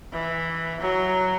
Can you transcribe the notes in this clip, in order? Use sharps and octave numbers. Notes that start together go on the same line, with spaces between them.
E3
F#3